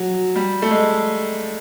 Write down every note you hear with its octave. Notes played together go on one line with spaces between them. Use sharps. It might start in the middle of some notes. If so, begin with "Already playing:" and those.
Already playing: F#3
G3
A3
G#3